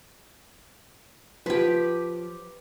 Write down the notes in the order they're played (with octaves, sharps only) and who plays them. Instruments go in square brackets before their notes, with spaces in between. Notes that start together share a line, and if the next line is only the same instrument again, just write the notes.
[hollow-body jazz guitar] F3 [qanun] G4 B4